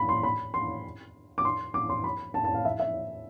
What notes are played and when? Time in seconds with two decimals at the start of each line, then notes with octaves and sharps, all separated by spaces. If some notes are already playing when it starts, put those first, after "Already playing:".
Already playing: B5
0.09 C6
0.23 B5
0.54 C6
1.38 D6
1.45 C6
1.74 D6
1.90 C6
2.04 B5
2.34 A5
2.44 A5
2.54 F5
2.65 E5
2.80 E5